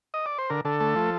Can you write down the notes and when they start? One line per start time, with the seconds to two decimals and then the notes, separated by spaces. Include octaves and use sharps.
0.14 D#5
0.26 D5
0.38 C5
0.50 D3 A#4
0.65 D3 A4
0.80 A3
0.96 F3